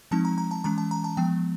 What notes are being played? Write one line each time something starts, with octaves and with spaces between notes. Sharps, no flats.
F3 G#3 C4 D#4 A5
A#5
A#5
A5
E3 G#3 C#4 A#5
A5
A#5
A5
F3 G#3 B3 G5